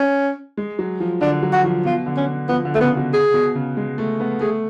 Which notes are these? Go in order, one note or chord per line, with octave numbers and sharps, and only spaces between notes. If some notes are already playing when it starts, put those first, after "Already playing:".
Already playing: C#4
G#3
F#3
F3
D3 D4
F#3
F#4
F3
B2 F4
D3
C#4
F3 B3
D3
A3
C#3 B3
B2
G#4
B2
C#3
G#3
A3
B3
A3 G#4